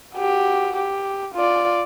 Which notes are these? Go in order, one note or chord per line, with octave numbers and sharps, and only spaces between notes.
F#4 G4
G4
F4 D5